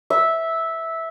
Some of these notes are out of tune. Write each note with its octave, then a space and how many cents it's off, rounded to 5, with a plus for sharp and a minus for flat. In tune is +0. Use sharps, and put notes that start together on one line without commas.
E5 -10